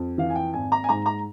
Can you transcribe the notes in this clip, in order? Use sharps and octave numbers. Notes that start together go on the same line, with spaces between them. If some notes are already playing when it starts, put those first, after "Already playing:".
Already playing: F2
E3 F5
G#5
G5
G#1 G#5
A#5
G#5
G#2 A#5
A#5